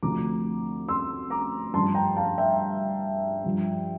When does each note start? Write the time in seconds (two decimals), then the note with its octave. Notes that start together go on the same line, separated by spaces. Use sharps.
0.02 D2 C3 F3 A#5 D6
0.89 C6 E6
1.30 A#5 D6
1.74 G2 F3 A5 C6
1.95 G5 A#5
2.17 F5 A5
2.38 E5 G5
3.44 G2 F3